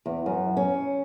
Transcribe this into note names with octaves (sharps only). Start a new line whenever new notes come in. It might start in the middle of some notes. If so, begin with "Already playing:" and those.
E2
F#2
C#4